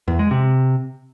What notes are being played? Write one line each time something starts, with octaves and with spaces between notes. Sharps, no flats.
E2
G#3
C3